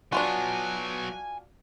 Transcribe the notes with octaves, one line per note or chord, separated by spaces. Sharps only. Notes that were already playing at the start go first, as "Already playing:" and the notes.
F#3 B3 D4 F4 F#4 G#5